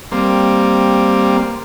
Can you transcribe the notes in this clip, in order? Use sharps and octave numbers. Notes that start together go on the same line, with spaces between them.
G3 A#3 C4